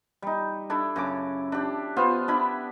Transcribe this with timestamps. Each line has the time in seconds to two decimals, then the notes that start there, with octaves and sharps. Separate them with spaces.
0.22 G3 D#4
0.70 D4 E4 A4
0.96 F#2 C#3 D6
1.52 D4 G4
1.96 B3 F4 C5
2.28 D4 E4 B5